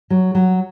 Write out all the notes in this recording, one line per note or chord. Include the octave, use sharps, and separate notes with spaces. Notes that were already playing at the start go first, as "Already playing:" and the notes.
F#3
F#3